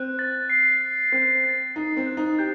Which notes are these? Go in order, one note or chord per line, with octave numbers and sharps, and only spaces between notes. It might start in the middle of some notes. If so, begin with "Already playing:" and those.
Already playing: C4 F#6
A6
C7
F#6
C4 F#6
A6
D#4 C7
C4
F#6
D#4
G4 G6